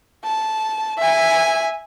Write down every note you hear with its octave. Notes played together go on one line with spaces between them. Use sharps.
A5
E5 G#5